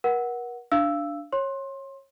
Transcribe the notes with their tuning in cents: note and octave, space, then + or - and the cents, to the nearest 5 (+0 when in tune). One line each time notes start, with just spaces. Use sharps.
A#4 +40 F#5 +0
D4 +0 F5 -25 E6 +0
C#5 -20 C6 +20